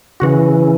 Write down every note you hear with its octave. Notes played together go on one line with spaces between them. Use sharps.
C#3 E3 F#4